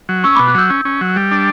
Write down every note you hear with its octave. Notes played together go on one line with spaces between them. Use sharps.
F#3
C#4 C#6 E6
B2 B5 D6
D6 F#6
F#3 E6 G6
C#4
C#4
F#3
G3
D4